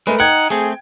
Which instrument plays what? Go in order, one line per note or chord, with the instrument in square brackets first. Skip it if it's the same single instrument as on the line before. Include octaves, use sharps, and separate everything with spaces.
[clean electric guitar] G#3 [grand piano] A3 A#4 B4
[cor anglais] D#4 [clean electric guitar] F#5 [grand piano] G5 G#6
[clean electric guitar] A3 C4 [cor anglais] G#4